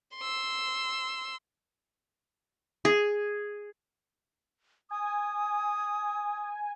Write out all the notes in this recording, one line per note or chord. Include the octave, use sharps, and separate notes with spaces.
C6 E6
G#4
G#5 D#6